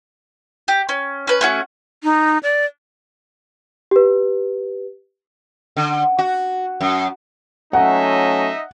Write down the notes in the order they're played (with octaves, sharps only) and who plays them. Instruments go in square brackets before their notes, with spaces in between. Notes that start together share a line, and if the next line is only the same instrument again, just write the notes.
[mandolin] G4
C#4
C#4 B4
A3 C#4 F#4
[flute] D#4
D5
[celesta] G4 B4
[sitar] D3
F#4
F#2
[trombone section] F#3 A3 C#4 [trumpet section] D#4 D#5 E5 [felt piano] F#5